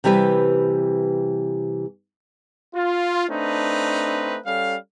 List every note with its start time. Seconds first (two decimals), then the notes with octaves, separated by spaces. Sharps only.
0.04 C3 E3 G3 G4 B4
2.75 F4
3.29 A3 C4 D4 D#4 B4
4.46 G3 C#4 A4 F5